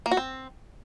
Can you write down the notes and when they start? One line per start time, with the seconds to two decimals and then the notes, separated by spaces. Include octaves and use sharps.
0.06 A#3
0.11 F#4
0.17 C4